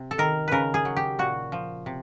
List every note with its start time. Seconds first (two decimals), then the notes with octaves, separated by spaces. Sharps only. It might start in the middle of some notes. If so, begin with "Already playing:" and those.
Already playing: C3
0.11 A4
0.18 D#3 A#4
0.48 C#3 A#4 B4
0.74 G#4
0.85 F#3
0.97 G4
1.19 A#2 F#4
1.52 F3
1.86 C3